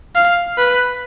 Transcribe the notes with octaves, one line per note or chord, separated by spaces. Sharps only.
F5
B4